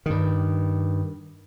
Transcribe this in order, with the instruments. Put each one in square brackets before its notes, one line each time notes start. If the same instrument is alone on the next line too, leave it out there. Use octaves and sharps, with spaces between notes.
[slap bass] G2 D#3